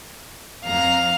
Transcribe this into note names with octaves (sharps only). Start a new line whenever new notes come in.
F2 F5 A#5